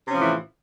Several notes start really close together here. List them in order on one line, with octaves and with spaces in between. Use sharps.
C3 C#4 F3 A2 E3